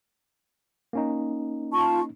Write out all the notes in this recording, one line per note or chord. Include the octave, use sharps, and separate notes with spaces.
A#3 C#4 D#4
F4 A5 C#6